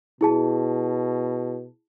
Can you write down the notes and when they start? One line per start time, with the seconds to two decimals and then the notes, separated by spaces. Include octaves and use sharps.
0.21 B2 E4 G#4 A5